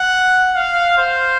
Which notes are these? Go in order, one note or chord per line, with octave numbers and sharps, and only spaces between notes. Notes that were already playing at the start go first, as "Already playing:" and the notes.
Already playing: F#5
F5
C5